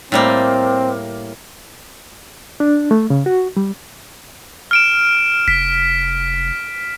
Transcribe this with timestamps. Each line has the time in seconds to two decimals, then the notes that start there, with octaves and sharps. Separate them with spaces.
0.12 A2 G3 A#3 C4
2.60 D4
2.91 A3
3.10 C#3
3.26 F#4
3.57 G3
4.71 F6 D7 E7
5.48 F1 B6